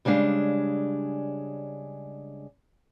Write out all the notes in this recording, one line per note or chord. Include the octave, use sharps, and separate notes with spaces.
C#3 G3 G#3 D4 F5